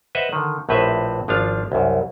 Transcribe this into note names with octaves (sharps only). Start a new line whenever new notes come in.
B4 C5 D#5 E5 F#5
D3 D#3
A#1 A2 C4 B4 C5 E5
G#1 F3 D4 F4 F5
C2 F#2